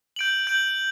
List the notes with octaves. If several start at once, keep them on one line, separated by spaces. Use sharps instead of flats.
G6 D7 F#7
G6 D7 F#7